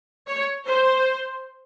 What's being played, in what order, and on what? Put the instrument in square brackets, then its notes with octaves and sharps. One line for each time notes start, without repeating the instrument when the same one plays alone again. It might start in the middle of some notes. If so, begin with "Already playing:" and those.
[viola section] C#5
C5